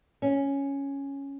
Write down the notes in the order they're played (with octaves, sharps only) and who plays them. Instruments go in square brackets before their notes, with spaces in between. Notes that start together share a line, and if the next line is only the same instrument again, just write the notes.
[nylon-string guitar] C#4